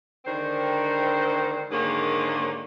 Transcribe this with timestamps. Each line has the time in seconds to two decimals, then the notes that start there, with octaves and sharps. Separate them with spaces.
0.25 D3 D#3 G#3 C4 D4 C5
1.71 G#2 D3 D#3 F#3 A#3 G#4